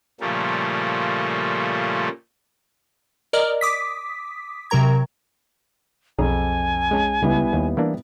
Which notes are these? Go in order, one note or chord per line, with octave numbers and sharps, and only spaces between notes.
A#2 C#3 F3 G3 A3 A#3
A#4 D5 D#5 A#5 F6
D6 D#6 B6
C3 F#3 A#4 A#5 G#6
B1 F2 G#4 G#5 A#5
G#3 C#4 A5
C#2 G3 B3 E4
D#2
E3 A#3 D4